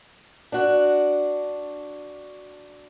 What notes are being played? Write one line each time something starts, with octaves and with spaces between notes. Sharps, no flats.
D4 F#4